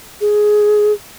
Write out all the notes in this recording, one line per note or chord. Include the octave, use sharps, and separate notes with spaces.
G#4